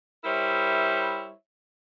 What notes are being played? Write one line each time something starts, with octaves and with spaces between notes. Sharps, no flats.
G3 E4 A#4 C5 C#5 E5